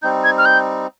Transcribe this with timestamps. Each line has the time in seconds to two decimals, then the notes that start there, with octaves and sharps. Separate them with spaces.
0.02 G3 C4 D#4 G6
0.24 G#6
0.38 F6
0.45 G6